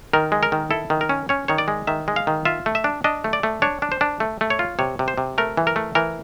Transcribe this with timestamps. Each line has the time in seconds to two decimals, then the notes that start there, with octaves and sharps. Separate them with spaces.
0.13 D#3 A#4
0.32 G#3
0.43 A#4
0.52 D#3
0.71 E4 A4
0.90 D#3
1.01 A#4
1.09 C#4
1.29 C#4 C#5
1.48 D#3 C#5
1.58 D5
1.68 G#3
1.87 D#3 E5
2.08 G#3
2.16 F5
2.27 D#3
2.45 F4 E5
2.66 A3
2.75 E5
2.84 D4
3.04 D4 D#5
3.24 A3
3.33 D5
3.43 A3
3.62 D4 C#5
3.82 D4
3.92 C5
4.01 D4
4.20 A3
4.41 A3
4.50 C#5
4.59 F4
4.79 C3 C#5
4.99 C3
5.08 C5
5.18 C3
5.38 A3 A#4
5.57 E3
5.67 A#4
5.76 A3
5.95 E3 A#4